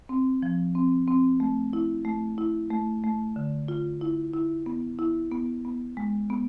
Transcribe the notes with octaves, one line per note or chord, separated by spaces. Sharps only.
C4
F3
C4
C4
A3
E4
A3
E4
A3
A3
D3
F4
E4
E4
B3
E4
B3
B3
G#3
B3